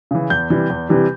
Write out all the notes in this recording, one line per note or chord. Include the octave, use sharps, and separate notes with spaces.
C#3 E3
E2 G6
C3 E3 G3
E2
C3 E3 G3